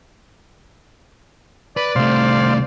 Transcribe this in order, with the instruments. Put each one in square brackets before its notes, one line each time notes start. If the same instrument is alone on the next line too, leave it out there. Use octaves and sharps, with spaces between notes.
[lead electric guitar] B4 [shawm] D5
[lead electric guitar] C2 A3 [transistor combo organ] C3 C5 F5